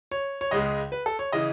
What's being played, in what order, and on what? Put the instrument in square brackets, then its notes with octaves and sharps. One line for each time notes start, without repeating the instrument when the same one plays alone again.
[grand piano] C#5
C#5
C#2 C#3 G#3 D#5
B4
A4
C#5
C#3 E3 D#5